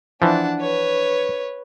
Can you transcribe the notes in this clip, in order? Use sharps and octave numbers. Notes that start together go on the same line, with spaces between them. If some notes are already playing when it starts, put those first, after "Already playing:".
E3 F3 D4 F#5
B4 C#5